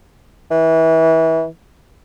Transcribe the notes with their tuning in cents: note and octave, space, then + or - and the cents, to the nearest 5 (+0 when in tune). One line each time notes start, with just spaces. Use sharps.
E3 -25